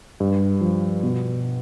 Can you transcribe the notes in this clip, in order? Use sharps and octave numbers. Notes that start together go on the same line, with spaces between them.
G2
F3
B2